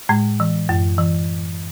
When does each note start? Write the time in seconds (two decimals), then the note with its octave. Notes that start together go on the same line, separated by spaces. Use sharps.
0.09 A2 G#3
0.40 E3
0.69 F#2
0.98 E3